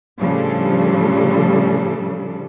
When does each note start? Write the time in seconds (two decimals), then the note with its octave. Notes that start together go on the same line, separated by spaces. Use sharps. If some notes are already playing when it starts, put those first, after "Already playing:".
0.20 A2 C#3 F3 G3 D4 A4